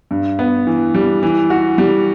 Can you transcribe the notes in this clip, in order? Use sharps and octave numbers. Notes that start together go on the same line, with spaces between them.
G2
B3
E3
G3
E3
F#4
G3